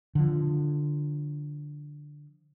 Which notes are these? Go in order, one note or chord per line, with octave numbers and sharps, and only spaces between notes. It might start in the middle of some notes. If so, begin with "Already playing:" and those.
D3 F3